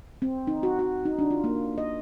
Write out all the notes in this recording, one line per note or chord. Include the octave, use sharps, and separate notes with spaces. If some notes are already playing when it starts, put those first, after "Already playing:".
C4
D#4
F#4
F#4
D#4
D4
F4
A#3
D#5